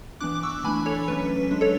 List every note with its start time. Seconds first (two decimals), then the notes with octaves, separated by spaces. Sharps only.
0.20 E3 B3 D4 D6 F#6
0.35 D6
0.43 C#6 E6
0.64 E3 A3 D4 G#5 B5
0.86 A4 C#5
1.08 F#3 A3 C#4 B4
1.51 G#3 D4
1.61 A4 C#5